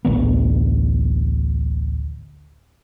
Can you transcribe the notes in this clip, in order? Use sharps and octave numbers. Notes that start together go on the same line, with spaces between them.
A1 D2 D#3 B3